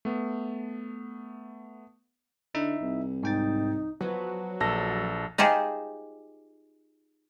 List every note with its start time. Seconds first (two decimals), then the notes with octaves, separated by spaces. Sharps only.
0.05 A3 B3
2.55 D3 D#4 E4 E5
2.82 C2
3.23 G#2 D#4 G5 A6
4.01 F3 F#3 B3 B4
4.60 A#1 A4 A#6
5.38 D#4 F4 G4 G#4 C5